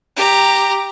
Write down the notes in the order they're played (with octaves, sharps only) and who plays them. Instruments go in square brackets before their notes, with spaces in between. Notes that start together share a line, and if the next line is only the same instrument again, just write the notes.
[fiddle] G4 A#5